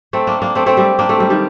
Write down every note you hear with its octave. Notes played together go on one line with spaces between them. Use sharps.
A3 C4
A#3 D4
A#3 D4
A3 C4
A3 C4
G3 A#3
A#3 D4
A3 C4
G3 A#3
D#3 G3